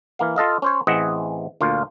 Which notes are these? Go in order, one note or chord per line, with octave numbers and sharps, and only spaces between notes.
E3 A#3 F5
F4 A4 D#5 F5
C#4 C5 C#5
A1 E3 C4 G#4 D#5 F#5
D2 A#2 F4 F5